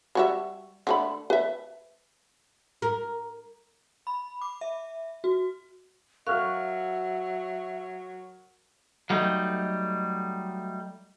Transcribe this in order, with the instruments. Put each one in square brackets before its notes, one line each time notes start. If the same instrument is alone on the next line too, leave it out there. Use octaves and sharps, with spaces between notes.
[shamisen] G3 F#4 E5
D3 A3 B5
B4 E5
[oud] A#4
[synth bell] B5
D6
E5
F#4
[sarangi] F#3 [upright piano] A#4 F6 [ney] E5 [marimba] F5 C#6 F#6
[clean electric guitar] F#3 G3 A3 D#4